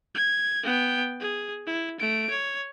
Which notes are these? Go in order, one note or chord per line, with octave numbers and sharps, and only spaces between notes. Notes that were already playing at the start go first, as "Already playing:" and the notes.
G#6
B3 G5
G#4
E4
A3 D7
C#5